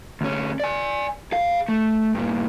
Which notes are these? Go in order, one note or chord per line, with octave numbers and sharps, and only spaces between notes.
D2 C#4
D5 G#5
G#4 F5
A3
G2 A#2